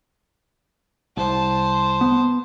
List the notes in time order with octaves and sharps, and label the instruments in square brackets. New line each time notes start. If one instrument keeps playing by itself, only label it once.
[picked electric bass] C2 [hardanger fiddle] C5 A5
[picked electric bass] B3